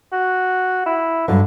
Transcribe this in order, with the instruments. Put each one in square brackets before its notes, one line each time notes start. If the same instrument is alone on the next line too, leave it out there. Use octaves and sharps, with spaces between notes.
[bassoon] F#4
E4
[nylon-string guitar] G2 F#3 [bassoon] D3